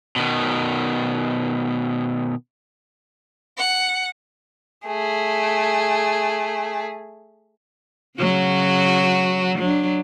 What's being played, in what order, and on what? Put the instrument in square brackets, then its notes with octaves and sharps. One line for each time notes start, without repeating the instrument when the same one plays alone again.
[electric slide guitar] B2 D#3
[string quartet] F#5
[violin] A3 G#4
[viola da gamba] C#3 F#3 F#4
F#3 D4